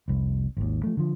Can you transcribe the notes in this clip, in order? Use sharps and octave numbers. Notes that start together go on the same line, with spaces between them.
F1 C2
G#1 D#2
F3 A3
D3 F3